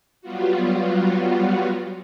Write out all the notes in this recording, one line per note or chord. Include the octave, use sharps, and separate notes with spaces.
F#3 G3 B3 F4 F#4